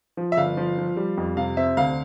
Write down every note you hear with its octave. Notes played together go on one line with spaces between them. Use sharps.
F3
E5
G1 F5
F3
F3
G3
F2
C3 F5
C4 E5
D2 F5